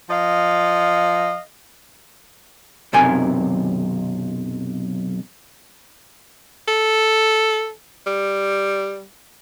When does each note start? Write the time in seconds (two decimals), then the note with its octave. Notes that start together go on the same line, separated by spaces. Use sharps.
0.10 F3 D#5 F5
2.93 B1 F#2 C3 A#4 G#5
6.68 A4
8.07 G3